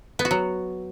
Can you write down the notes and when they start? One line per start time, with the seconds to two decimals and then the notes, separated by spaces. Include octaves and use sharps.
0.19 B3
0.25 F#4
0.31 F#3